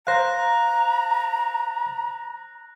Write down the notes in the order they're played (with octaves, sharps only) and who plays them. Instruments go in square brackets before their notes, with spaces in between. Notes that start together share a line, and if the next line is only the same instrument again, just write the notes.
[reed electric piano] C5 F5 [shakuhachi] A#5 [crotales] F#6 A#6